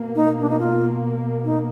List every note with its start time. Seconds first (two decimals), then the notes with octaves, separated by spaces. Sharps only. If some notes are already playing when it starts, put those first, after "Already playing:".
Already playing: B2 A#3
0.15 D#4
0.40 D4
0.50 D#4
0.60 F4
1.45 D#4